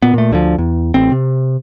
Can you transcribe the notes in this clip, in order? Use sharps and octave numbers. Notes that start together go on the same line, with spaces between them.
A#2 B3
A#2 A3
D2 D3 D#3 F3
E2
A1 C4
C3